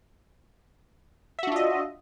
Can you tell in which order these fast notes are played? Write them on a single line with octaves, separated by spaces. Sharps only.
E5 F#4 D4 F4 D#5